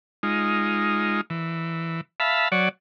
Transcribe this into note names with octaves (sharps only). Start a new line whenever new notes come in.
G#3 D#4 F4
E3
E5 F5 A5 B5
F#3 C#5 D5 F#5